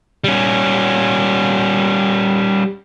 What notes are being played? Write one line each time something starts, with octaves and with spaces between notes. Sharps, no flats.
G3 C#4